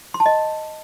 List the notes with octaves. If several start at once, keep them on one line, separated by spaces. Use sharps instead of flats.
C6
A5
D#5